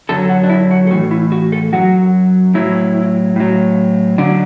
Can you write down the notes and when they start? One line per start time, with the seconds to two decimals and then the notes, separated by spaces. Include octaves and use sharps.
0.09 F#2 D3 F#3 A4
0.29 F#4
0.43 D4
0.49 E4
0.71 F#4
0.87 A4
0.91 A2 F#4
0.94 E3
1.11 E4
1.32 F#4
1.52 A4
1.72 F#2 F#3 F#4
2.54 A2 F#3 E4
3.36 A2 F#3
4.18 D3 F#3 D4